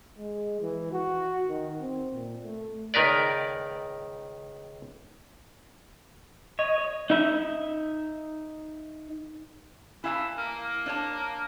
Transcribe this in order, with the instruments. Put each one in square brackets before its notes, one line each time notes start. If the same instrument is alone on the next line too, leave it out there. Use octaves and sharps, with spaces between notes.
[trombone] G#3
E3
F#4
D#3
C4
A#2
A3
[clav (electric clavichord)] C#2 D#3 A#4 B4 D5
[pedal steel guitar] C#5 [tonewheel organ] D#5
[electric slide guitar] D#4 E5
[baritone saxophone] E3 [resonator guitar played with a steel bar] E4 F5 A5
[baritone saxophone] A#3
[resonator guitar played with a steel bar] D4 C#5 A5